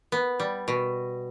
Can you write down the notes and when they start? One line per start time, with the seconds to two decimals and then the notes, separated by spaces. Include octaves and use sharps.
0.12 B3
0.40 G3
0.68 B2